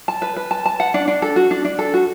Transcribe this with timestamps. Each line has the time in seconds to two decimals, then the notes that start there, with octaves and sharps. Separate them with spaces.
0.08 A5
0.22 B4
0.36 B4
0.51 A5
0.66 A5
0.80 F#5
0.94 D4
1.08 D4
1.22 A4
1.36 F#4
1.51 D4
1.65 D4
1.79 A4
1.94 F#4